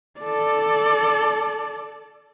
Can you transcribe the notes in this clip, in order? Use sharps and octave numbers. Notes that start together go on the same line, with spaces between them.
A4 D5